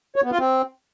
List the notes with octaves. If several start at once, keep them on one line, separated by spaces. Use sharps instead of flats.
C#5
B3
F4
C4